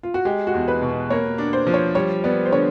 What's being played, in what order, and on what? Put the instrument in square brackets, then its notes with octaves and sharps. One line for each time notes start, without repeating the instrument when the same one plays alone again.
[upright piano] F4
F#4
[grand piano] G#3 [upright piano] G4
[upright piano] F#4
[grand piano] E2
[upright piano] B4
[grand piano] B2
[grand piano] A#3 [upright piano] C#5
[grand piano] D4
[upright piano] C5
[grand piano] F3
[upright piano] C#5
[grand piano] G3 [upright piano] C#5
[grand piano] B3 [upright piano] D5
[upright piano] C5
[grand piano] D3 [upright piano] C#5